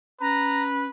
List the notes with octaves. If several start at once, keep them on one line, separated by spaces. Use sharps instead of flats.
C#4 B4 A#5